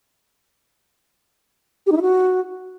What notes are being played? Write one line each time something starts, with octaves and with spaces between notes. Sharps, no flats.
G4
D#4
E4
F#4